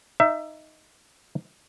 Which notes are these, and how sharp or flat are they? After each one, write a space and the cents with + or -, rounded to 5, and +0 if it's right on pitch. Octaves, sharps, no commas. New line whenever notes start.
D#4 +0 E5 +20